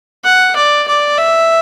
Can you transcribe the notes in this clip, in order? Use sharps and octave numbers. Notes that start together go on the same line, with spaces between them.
F#5
D5
D5
E5